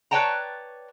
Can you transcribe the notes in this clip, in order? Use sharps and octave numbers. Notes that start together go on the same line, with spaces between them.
B4 C#5 D5 G5 A5 A#5